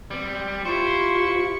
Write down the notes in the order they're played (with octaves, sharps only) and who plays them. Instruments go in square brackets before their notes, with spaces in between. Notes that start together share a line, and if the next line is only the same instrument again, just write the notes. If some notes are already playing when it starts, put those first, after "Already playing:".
[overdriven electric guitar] G3 [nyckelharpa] C4
[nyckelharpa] E4 G4 [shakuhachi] F4 [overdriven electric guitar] C5 [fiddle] C#6